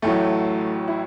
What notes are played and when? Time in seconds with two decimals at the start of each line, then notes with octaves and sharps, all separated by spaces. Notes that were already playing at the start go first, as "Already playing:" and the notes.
0.02 A1 A2 F#3 A3
0.88 E4